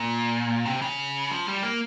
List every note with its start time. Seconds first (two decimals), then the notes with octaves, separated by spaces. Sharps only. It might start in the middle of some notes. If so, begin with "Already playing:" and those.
Already playing: A#2
0.65 C3
0.82 C#3
1.31 F3
1.47 G3
1.63 A#3